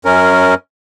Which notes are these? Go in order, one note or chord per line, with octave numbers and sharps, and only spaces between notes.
F#2 C#4 A#4